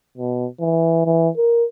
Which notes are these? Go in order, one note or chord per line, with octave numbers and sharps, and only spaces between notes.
B2
E3
E3
A#4